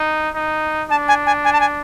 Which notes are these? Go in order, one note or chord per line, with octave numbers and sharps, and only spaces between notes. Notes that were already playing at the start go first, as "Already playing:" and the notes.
Already playing: D#4
D#4
D4 A5
G#5
G#5
G#5
A5
G#5